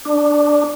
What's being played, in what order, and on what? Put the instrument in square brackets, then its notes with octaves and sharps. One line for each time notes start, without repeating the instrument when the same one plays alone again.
[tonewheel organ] D4